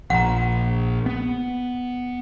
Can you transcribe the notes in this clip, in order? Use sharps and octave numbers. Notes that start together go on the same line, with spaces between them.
A#1 F#5 A#5
B3